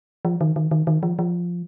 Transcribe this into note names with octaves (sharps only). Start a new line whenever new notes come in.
F3
D#3
D#3
D#3
D#3
F3
F3